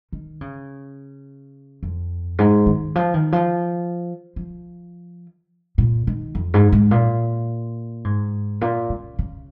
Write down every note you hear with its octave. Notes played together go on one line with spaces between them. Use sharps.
D#3
C#3
F2
G#2
D#3
F3
D#3
F3
F3
A#2
D#3
F2
G#2
G#2
A#2
G#2
A#2
C#3
C#3